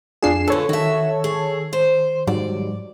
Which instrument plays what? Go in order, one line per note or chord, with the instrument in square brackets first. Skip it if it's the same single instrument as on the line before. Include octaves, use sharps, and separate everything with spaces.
[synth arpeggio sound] F2 C7 E7 [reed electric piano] D4 F4 G#4
[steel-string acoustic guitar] D3 B4 [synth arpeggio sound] A4 C#5
[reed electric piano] D#3 [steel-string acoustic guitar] F#4 E5
[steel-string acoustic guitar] G#4
C5
[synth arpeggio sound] G#2 F#3 G3 [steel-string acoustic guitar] D5